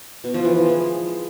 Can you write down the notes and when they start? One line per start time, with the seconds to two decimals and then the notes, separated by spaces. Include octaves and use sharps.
0.24 B2
0.34 F3
0.45 E3
0.55 F3
0.66 G#3